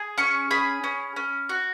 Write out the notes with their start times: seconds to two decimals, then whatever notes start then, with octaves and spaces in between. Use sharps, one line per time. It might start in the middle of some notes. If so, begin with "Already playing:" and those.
Already playing: G#4
0.18 C#4 C#6
0.51 G#4 B5
0.84 C#4
1.16 C#4
1.49 F#4